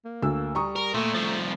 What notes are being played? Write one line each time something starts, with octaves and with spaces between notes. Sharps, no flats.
A#3
D2 E6
G3 A#5 C#6 D#6
A#4
A#2 A3
C2 F3